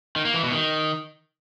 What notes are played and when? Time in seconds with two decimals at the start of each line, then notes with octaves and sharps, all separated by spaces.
0.16 D#3
0.25 A#3
0.34 E3
0.43 B2
0.52 D#3